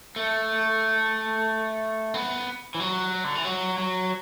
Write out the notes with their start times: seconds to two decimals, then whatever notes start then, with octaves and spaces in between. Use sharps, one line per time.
0.16 A3
2.14 B3
2.75 E3
2.80 F#3
3.24 D3
3.35 E3
3.45 F#3
3.78 F#3